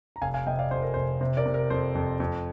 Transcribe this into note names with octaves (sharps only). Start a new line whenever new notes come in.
A#5
F1 F5 G#5
F5 G#5
C3 D#5 G5
D5 F5
F2 C5
A#4
F1 C5
C3 C5
A#4 D5
C3
A#4
F2 C5
F2
F2